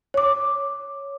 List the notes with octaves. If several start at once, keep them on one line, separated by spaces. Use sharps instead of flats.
C#5 D6